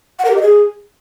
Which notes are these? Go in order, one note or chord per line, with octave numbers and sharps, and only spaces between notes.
F#5
A#4
G4
D#5
G#4